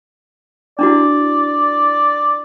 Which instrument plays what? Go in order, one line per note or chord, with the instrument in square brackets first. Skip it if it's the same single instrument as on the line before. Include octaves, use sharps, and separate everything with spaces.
[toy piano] D4 E4 F#4 [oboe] D5